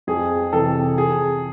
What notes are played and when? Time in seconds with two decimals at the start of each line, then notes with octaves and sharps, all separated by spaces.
0.07 F2 G#4
0.53 C3 E3 A4
0.98 G#4